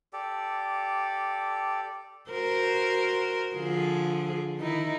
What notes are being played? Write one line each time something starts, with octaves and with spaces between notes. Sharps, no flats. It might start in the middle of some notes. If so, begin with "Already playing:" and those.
G4 A4 D5
F#4 A#4 C5
D3 F3 G#4
D#3 D#4 E4